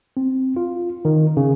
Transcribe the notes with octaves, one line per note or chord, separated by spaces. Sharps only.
C4
F4
D#3
C#3